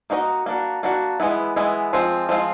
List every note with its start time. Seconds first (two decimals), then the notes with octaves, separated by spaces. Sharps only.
0.10 A#3 D#4 F#4 A#4 D#5
0.46 A#3 D4 F#4
0.83 A#3 D4 F#4
1.20 E3 G#3 B3 E4
1.56 E3 G#3 B3 E4
1.93 F3 G#3 C4 F4
2.29 F3 G#3 C4 F4